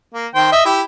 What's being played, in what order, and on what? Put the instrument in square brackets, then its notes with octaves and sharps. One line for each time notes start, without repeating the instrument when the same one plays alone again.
[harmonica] A#3
D#3 C5 G5
D#5 E5
E4 G4